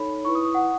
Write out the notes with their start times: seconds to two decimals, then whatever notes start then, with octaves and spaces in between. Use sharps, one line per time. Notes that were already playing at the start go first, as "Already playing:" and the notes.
Already playing: D#4 A4 C#5 B5
0.25 E4 B4 C#6
0.35 D#6
0.45 D#6
0.55 F#5